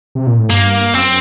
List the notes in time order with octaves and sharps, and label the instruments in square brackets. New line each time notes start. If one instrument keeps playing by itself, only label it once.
[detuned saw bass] C3
A#2
A2
[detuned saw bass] G2 [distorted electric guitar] A#3
[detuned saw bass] F#2 [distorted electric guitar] C4